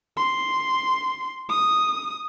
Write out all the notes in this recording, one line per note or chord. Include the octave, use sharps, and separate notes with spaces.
C6
D#6